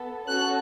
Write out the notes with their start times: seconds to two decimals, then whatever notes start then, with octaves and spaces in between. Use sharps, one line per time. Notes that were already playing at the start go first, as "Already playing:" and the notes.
Already playing: B3 A4
0.27 C#4 F#4 A4 F#6